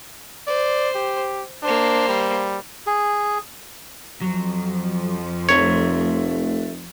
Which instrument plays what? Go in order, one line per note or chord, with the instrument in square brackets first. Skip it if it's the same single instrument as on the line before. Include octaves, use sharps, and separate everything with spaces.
[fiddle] C5 [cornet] D5
[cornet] G4
[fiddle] A#3 C5 [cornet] D4
[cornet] G3
[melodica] G#4
[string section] F2 F3 [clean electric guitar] F#3
[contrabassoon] F1 [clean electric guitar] A3 A#4 [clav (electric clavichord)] C#5